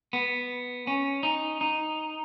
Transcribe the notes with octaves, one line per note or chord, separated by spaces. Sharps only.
B3
C#4
D#4
D#4